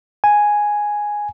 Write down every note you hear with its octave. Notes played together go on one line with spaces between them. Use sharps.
G#5